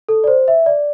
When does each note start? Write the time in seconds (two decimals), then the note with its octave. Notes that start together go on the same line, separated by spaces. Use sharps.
0.09 A4
0.24 D5
0.27 C5
0.48 E5
0.66 D5